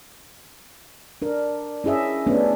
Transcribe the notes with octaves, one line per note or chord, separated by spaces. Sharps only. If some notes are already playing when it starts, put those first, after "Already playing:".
D4 A#4
C#4 E4 G#4 D#5 E5
A3 B3 C#4 D4